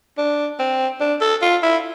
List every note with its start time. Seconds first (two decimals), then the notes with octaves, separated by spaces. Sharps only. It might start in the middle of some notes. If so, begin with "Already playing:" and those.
0.18 D4
0.59 C4
1.00 D4
1.21 A4
1.42 F4
1.63 E4